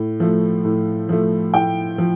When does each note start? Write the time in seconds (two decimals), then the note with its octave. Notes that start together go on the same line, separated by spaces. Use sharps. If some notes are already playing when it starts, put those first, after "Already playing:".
Already playing: A2
0.20 F3 A3
0.65 A2
1.09 F3 A3
1.54 A2 G5
1.98 F3